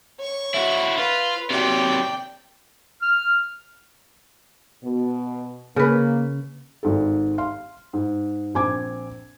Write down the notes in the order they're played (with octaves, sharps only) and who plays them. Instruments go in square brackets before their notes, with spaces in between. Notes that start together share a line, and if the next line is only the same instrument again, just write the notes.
[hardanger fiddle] C#5 C#6
[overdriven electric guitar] E4 F#4
[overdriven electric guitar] F4 [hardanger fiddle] B4
[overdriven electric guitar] C3 F#3 [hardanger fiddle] D5 G5
[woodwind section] F6
[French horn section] B2
[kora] C#3 B4 [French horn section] A#3
[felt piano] G#1 G#2 A4
F5 C6
G#2
A#1 C4 G#5 D6 G#6